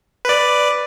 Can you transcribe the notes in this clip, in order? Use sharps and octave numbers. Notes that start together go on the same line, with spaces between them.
B4 D5